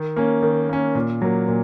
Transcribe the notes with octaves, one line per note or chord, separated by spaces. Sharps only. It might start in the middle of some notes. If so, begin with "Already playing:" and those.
Already playing: D#3
A#3 C#4
D#3
A#3 C#4
A#2
F#3 A#3
A#2